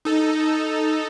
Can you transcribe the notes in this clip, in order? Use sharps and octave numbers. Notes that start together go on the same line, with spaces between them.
D#4 A4